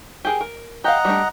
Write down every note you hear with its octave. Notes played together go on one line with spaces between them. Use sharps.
G4 G#4 A#4
A#4
G4 D#5 F5 F#5 A#5
G3 A3 D4